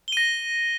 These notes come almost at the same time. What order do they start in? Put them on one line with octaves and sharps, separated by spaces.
G7 D#7 A#6